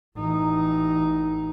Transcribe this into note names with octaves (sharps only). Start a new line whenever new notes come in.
A1 D#4